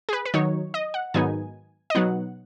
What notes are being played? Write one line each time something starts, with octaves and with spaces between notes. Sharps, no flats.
G#4
B4
B4
D#3 F#3 D#4 C#5
D#5
F#5
G#2 D#3 F#3 B3 D#4 G#5
D#5
B2 F#3 B3 D#4 F#5